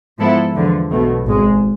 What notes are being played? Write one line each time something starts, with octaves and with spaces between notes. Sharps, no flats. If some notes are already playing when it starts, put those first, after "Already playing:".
G#2 F3 B3 E4 A4
E2 D3 F3
B1 B2 A3
G#1 G#2 G#3